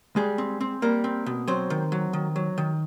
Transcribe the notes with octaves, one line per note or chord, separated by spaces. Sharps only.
G3 G#3 G#4
C4
C4
G3 A#3 A#4
C4
B2
F#3 C4 C5
D#3
F#3
D#3
F#3
D#3